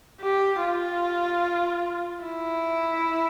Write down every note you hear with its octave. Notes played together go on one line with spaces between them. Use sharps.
G4
F4
E4